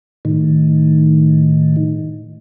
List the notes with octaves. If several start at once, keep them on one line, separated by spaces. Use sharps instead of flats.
A2 D#3